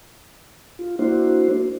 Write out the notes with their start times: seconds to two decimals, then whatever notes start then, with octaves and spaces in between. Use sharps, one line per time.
0.79 F4
0.99 A#3 D4 E4 F#4 C5